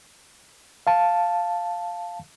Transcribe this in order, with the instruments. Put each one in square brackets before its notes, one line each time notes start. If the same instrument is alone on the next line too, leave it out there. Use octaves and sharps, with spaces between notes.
[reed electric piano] F5 A5